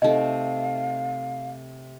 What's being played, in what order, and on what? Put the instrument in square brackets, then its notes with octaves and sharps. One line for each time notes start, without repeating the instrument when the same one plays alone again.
[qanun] C3 A3 [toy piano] D#4 D#5 [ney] F5